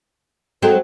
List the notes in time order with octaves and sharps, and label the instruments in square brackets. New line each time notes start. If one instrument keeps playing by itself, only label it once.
[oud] F#3 G#3 C4 [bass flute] A4